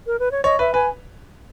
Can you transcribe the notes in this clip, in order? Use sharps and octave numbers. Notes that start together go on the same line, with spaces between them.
A#4
B4
C#5
C#5 D#5
B4 E5
B4 G#5